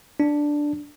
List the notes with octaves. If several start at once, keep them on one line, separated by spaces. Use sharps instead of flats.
D4